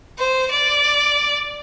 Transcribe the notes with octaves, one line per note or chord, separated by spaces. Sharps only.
C5
D5